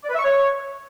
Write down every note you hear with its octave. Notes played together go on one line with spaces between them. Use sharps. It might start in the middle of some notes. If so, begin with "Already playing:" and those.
D5
B4
E5
C#6
C#5